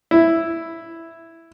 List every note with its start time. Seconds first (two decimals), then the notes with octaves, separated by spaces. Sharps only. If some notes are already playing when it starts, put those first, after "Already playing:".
0.11 E4